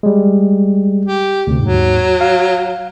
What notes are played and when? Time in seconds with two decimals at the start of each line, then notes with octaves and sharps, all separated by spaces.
0.03 G3 G#3
1.05 G4
1.47 D2 C3
1.60 D#2 G#2 F#3
2.21 F5